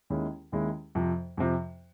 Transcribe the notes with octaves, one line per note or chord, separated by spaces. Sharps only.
D#2 D#3 G#3 C#4 E4
D#2 D#3 G#3 C#4 E4
F2 C3 F3
F2 C3 F3